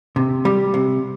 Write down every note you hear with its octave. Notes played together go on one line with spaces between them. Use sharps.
C3
G3
C3